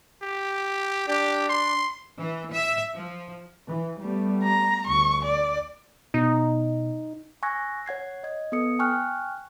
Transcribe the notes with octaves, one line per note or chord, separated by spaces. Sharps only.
G4
D4 G4 D5
C6
E3
E5
F3
E3
G3 A3 B3
A#5
D2 C#6
D5
B2 D#4
G#5 C#6 E6 F#6 G#6 A#6
C#5 F#5 G#6 C7
D#5 G#6
B3 A4 D#6 C#7
G5 G#5 C#6 F6 F#6